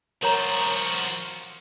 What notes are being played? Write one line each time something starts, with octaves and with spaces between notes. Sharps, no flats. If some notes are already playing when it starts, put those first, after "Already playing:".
F3 F#4 A#4 C#5 A#5